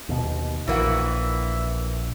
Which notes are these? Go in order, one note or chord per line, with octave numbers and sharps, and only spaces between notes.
D#2 B2
A#1 E3 A#3 F#4 E5